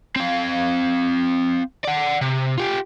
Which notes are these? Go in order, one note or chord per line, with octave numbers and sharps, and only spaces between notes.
C4 F5
D5 F#5
C3
F4 G4